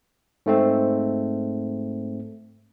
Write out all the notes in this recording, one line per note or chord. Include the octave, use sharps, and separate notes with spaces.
G#2 A3 C4